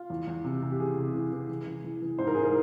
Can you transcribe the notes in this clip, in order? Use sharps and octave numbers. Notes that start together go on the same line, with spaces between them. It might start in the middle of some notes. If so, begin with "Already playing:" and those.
Already playing: F4
E2
E2
C3
C3
G4
E3 G#4
C3
E3
E3
E3
E3
E3
E3
G#2 C5
A#4
G#2 G#4
A#4